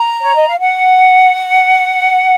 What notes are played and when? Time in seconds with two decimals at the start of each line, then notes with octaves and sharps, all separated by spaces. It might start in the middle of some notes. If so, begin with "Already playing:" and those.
Already playing: A#5
0.21 C#5
0.35 D#5
0.48 F5
0.60 F#5